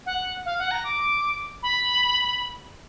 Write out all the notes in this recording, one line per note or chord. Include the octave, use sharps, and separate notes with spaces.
F#5
F5
F#5
A#5
D6
B5